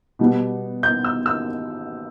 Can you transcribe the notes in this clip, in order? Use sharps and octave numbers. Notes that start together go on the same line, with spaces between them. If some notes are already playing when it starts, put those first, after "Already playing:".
B2 G3 B3
G6
E6
E6